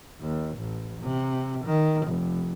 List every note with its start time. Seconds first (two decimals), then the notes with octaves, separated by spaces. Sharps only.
0.20 D#2
0.57 A1
1.02 C3
1.65 D#3
2.07 F1